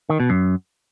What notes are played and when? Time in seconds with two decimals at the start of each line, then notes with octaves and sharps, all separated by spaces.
0.10 D#3
0.20 B2
0.30 F#2